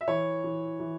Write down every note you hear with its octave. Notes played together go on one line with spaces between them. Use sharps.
E5
E3 C#5
E3
E3